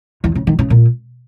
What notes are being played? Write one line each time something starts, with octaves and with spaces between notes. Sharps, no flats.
E2
C#3
D#3
C#3
A#2